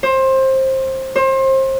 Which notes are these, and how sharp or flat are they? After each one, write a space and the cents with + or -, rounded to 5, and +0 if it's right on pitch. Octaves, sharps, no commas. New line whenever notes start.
C5 +20
C5 +30